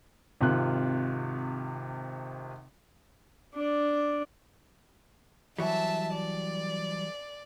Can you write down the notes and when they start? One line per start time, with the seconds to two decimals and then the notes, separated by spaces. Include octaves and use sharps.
0.41 G#1 C3 F4 F#6
3.55 D4 D5
5.58 E3 F#3 G3 E5 A5
6.13 D5